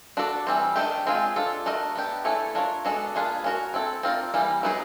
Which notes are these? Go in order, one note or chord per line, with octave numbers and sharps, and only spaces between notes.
D4 F#4 A4 D5
E3 G3 C4
D#3 F#3 A3 D4 G4
G#3 C4 F4 G#4
D4 F4 A4
A3 D4 F#4 A#4 D#5
B3 D4 G4
A3 C#4 E4 A4 C#5
D4 F4 A#4 C#5
G#3 B3 D4 F#4 A4
A#3 D4 F4 G#4 B4
C#4 F#4 A#4
C4 E4 A4
C4 F4 A#4 D5
E3 G3 A#3
F#3 B3 D#4 G#4